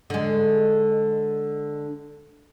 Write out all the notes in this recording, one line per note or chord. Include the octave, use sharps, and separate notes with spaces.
D3 G#3